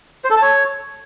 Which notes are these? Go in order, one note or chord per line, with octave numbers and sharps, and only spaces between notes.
C5
A4
A5
C#5